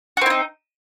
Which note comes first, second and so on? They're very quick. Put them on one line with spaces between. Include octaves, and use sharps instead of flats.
F#4 C4 E4 D#4